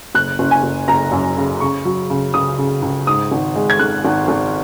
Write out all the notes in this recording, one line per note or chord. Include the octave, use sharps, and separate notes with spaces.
F#1 F#6
F#1
G#5
F#1
F#1 A#5
F#2
C#3
C#3 C#6
F#3
C#3
C#2 D#6
C#3
C#2
G#2 D#6
G#1
G#3
G#6
G#1 F#6
G#1
G#1